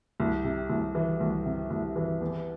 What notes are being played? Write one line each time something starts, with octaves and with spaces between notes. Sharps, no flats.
C2
C3
C2
E3
C2
C3
C2
E3
E2